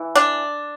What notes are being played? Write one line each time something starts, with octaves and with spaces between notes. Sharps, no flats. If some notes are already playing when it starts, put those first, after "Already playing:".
Already playing: E3
D4